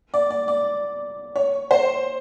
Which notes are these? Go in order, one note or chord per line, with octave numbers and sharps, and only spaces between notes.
D5
D5
D5
C#5
C5